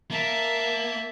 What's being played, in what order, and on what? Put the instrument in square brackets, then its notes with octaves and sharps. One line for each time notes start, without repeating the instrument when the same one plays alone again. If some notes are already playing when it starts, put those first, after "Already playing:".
[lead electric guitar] A#3 [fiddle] E5 A5